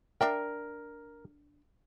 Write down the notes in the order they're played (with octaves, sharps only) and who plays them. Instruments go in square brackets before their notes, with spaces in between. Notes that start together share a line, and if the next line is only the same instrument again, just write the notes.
[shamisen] D4 E5 G5 [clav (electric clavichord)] A#4